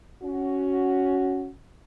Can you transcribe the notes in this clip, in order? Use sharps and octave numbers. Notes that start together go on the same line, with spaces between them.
C#4 F#4